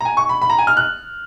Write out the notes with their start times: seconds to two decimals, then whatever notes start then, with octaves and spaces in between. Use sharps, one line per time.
0.01 A#5
0.05 G#5
0.17 C#6
0.29 B5
0.42 B5
0.50 A#5
0.58 G#5
0.67 F6
0.77 F#6